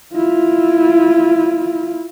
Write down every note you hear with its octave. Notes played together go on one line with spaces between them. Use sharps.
E4 F4